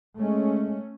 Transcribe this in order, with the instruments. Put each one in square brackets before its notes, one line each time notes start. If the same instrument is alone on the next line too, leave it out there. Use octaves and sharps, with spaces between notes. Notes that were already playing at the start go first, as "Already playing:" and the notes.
[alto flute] G#3 [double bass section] A3 C#4